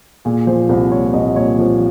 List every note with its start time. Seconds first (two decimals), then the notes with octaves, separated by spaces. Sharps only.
0.25 A#2 G#4
0.47 F3 C5
0.69 C2 C5
0.91 A#2 C#5
1.13 C2 D#5
1.27 D#5
1.36 A#2 C#5
1.59 F3 C5